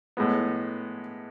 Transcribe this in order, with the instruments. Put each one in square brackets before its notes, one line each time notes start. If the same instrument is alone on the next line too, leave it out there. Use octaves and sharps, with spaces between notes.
[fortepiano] A2 G#3 B3